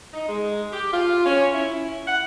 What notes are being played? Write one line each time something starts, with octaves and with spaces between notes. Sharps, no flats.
D#4
G#3
G4
F4
C#4
E4
F#5